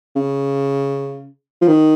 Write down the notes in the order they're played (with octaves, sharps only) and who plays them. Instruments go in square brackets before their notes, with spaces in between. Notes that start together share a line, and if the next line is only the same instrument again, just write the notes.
[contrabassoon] C#3
F3
D#3